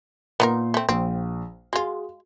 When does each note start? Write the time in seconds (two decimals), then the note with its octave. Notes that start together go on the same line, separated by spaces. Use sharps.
0.40 A#2 B3 D#4 A#4 C6
0.74 A3 C4
0.89 A#1 C4
1.73 G#3 F4 F#4 G#4